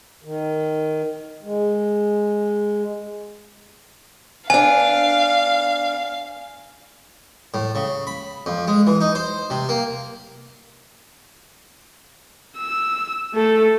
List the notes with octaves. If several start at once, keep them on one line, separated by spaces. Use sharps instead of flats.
D#3
G#3
B3 D4 F5 G#5
A2
C#3
B5
F2
G#3
E3
D#4
C5
C3
A#3
E6
A3 A4